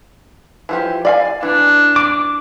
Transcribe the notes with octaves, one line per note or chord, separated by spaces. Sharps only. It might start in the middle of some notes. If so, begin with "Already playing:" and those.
E3 F3 G4
D5 F5 G#5
E3 D4
D6